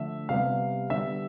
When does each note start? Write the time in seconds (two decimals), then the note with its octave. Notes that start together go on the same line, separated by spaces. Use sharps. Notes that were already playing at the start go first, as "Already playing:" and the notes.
Already playing: D3 F3 A3 E5
0.29 C3 G3 B3 F5
0.90 D3 G3 B3 E5